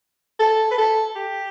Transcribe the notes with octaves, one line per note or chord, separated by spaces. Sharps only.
A4
B4
A4
G4